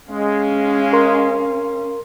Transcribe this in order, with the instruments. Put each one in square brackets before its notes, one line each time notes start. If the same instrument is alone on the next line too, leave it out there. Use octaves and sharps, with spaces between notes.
[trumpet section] G#3 [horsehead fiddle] C#4 F5
[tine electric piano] A#4 C6